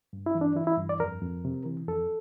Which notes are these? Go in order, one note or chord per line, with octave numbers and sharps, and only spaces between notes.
G2
E4
E3
D4
E3 E4
E4
G2
D5
F2 A#4
F2
C3
E3
F2 A4